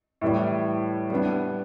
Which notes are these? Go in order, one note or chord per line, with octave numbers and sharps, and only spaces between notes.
A2 E3 G3
G3 B3 D4